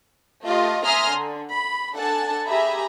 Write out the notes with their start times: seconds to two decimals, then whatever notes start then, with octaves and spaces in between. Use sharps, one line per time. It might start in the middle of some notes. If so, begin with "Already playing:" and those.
0.44 A3 F4 G4 D#5
0.84 E5 G#5 A#5 C6 D#6 F6
1.13 D3
1.52 B5
1.94 D4 A4 F#5 G#5 A5
2.46 G4 G#4 E5 G#5 A#5 B5